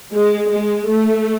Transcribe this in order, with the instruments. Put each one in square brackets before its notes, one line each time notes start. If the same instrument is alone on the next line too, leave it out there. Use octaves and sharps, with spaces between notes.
[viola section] G#3
G#3
A3